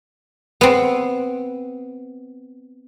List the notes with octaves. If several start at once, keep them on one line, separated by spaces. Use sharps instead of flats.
B3 C4